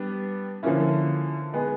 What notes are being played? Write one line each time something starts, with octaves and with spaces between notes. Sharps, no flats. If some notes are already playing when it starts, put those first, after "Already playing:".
Already playing: G3 B3 D4 G4
D3 F3 A#3 C#4 E4
G#3 B3 D#4 G#4